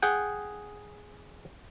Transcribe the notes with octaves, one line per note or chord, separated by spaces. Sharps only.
G#4 F#5 G5